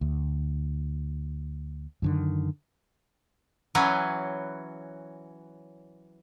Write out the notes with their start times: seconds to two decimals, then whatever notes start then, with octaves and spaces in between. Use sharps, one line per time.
0.01 D2
2.02 F#2 D3 D#3
3.75 E3 F#3 C#4 B4